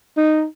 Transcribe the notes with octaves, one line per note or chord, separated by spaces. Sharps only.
D#4